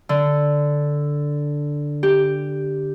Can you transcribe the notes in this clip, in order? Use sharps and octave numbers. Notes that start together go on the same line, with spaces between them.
D3
G4